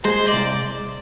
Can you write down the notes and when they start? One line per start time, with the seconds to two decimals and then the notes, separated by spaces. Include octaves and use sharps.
0.05 G#3 C5
0.26 D5
0.33 C2